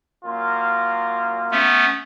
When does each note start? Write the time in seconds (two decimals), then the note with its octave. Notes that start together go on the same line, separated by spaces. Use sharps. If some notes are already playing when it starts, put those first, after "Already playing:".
0.24 F#2 A#3 F4
1.51 A3 B3 C#4